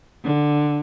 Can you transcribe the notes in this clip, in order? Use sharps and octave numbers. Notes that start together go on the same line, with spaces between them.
D3